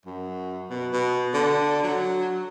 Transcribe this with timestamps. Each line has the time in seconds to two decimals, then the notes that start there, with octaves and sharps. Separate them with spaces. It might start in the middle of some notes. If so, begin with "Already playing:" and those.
0.06 F#2
0.70 B2
0.93 B2
1.34 D3
1.83 F#3